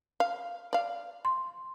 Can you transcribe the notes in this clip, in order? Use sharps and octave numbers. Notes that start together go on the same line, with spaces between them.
F5
D5 F5
C6